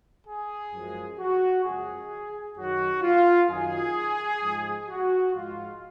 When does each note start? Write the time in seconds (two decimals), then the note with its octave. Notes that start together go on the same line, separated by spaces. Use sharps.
0.26 G#4
0.73 F#2 F3 G#3
1.19 F#4
1.65 F#2 C#3 F3 G#3 G#4
2.57 F#2 D#3 F#3 F#4
3.03 F4
3.49 F#2 D#3 F#3 G#4
4.41 G#2 F3 G#3
4.88 F#4
5.33 G#2 F3 G#3 F4